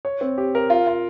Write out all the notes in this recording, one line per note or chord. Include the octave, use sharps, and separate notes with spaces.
C#5
C4
G4
A#4
F4
F4